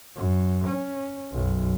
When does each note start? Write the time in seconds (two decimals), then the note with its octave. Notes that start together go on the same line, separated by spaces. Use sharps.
0.16 F#2
0.68 C#4
1.32 B1 F#2